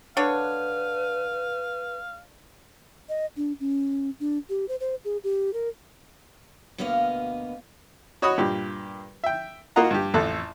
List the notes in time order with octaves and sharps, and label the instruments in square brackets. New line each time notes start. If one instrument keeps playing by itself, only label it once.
[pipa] D3 D4 C#5 [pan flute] B4 [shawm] F5
[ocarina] D#5
D4
C#4
D4
G4
C5
C5
G#4
G4
A#4
[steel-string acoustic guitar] D2 B2 A#3 B3 D#5 F5
[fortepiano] F#4 C#5 D#5 B5 D#6
G2 A#2 G4
E5 G5
A#3 F4 F#4 D#5 F#5 A#5
G2 G4
A1 F2 A4 F#6